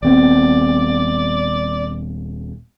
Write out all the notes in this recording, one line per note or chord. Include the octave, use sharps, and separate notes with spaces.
D#1 B3 C4 D5